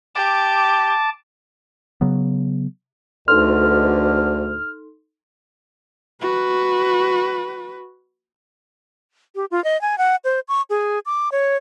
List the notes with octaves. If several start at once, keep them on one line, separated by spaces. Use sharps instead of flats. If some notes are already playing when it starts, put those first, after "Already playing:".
G4 A5 D6
C#3 F#3 B3
D2 G#2 B2 D3 D#4 A4 C6 F6
F#4 B4
G4
F4
D#5
G#5
F#5
C5
C#6
G#4
D6
C#5